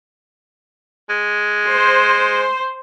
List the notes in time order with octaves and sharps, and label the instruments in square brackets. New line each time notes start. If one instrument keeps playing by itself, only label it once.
[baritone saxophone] G#3
[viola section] C5